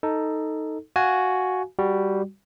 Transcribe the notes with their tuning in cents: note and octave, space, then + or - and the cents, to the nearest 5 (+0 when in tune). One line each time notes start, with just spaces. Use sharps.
D#4 +5 A4 +10
F#4 +0 F5 +0 G#5 +15
G3 +0 F#4 +15